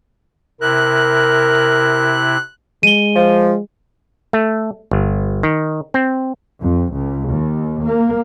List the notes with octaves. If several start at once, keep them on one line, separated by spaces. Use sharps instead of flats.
C3 E4 A#4 F#6
G#3 D#7 G7
F3
A3
G1
D#3
C4
F2
C#2
D#2
A#3